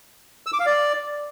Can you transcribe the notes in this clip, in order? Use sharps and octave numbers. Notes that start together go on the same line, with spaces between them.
E6
D6
F5
D5